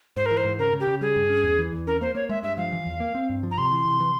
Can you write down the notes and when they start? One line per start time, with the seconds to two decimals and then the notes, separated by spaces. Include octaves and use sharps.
0.16 G#2 C5
0.26 A#4
0.31 E3
0.37 C5
0.45 G#2
0.59 C#3 A#4
0.73 C#3
0.80 G4
0.87 C#3
1.01 G3 G#4
1.16 G2
1.30 C#4
1.44 E2
1.58 E3
1.72 E2
1.87 C#4 A#4
2.01 A#3 C5
2.15 A#3 C#5
2.29 G#3 E5
2.43 G2 E5
2.57 F3 F5
2.72 E3
2.86 E2
3.00 A#3
3.15 C4
3.30 G2
3.43 F3
3.51 A#5
3.58 C3 C6
3.72 E3
3.85 C3
4.00 E3